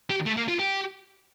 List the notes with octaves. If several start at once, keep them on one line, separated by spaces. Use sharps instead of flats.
G4
A3
A#3
F4
G4